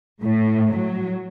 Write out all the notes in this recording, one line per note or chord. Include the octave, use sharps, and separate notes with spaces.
A2
F#3